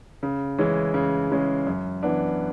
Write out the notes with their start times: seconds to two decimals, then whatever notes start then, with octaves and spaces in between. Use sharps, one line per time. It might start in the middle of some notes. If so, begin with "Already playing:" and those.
0.23 C#3
0.58 E3 G#3 C#4
0.94 C#3
1.30 E3 G#3 C#4
1.67 F#2
2.03 E3 B3 D4